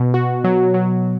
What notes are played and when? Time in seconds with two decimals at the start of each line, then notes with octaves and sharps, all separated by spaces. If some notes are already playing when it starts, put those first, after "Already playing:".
Already playing: B2
0.14 F#4
0.44 F#3
0.74 F#3